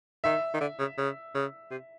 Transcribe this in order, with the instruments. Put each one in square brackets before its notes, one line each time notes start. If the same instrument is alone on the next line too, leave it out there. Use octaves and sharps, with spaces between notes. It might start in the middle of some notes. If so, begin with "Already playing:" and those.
[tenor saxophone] D#3 [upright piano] E5
[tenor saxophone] D#3
D3
C#3
C#3
C#3
C3